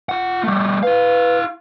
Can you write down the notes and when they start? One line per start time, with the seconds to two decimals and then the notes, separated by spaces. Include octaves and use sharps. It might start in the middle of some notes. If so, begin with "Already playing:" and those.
0.09 F4 F#5
0.44 G3 A3
0.83 E4 B4 F5